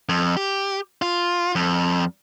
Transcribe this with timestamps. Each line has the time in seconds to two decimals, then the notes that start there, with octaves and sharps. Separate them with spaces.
0.09 F2
0.37 G4
1.02 F4
1.55 F2